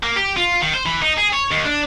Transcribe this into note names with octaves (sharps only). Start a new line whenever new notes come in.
A#3
G4
F4
D#3
C5
E3
D#4
G#4
C#5
D#2
D4